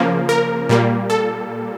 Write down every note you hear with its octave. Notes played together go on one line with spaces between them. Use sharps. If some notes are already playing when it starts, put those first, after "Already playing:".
Already playing: C#3 F3 A#3
A#4
A#2 G3 A#3
A4